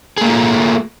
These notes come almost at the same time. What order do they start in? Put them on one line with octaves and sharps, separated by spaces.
G#4 A#3 A3 F4